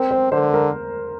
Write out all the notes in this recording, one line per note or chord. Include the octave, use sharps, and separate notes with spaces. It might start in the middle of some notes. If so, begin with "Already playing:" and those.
Already playing: C4 A#4
C5
D3 C5
A#4